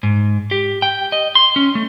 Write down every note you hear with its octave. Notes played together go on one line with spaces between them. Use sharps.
G#2
G4
G5
D#5
C6
C#4
A3